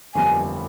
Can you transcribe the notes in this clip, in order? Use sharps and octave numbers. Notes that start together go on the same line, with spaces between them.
G1 F2 E3 G3 A#3 G#5